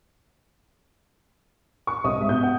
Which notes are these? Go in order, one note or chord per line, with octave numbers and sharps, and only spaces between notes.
C#6
C2 D#5 D#6
G#2 E5
B2 G6
F#5